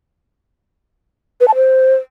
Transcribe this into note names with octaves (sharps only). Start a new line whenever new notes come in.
B4
A5
C5